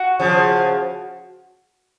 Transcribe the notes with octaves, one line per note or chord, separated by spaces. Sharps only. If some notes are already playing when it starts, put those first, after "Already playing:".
Already playing: F#4
C#3 F3